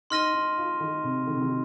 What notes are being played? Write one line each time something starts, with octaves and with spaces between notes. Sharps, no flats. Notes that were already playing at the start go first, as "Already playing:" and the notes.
D#4 C6 F6 A#6 D#7 G7
D#4
F4
D#3
C3
D#3
C3
D#3